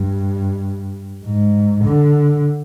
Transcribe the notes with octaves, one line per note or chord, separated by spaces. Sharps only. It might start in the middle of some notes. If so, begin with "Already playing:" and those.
Already playing: G2
G#2
D3